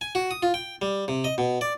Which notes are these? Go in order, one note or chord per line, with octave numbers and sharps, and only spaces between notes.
G#5
F#4
D#6
F4
G5
G3
C3
D#5
B2
D5